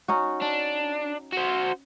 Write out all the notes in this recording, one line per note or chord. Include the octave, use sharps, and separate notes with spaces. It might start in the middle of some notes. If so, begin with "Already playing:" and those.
C#4 D#4 F#4
D4
F#4 C5